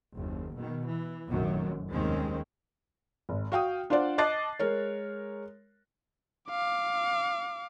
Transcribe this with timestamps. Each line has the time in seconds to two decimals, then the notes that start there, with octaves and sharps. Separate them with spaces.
0.14 F#1 D#2
0.54 B2 D#3
0.85 E3
1.28 F1 A#1 F#2 D#3 F#3
1.91 F1 D#2 D#3 G#3 C4 C#4
3.29 G#1
3.52 F#4 F5 G5 D#6
3.90 D4 F4 C5 D5 F#5
4.18 D#5 A5 D6 F#6 A6 C7
4.59 G#3 A#4 C#5
6.50 F5 D6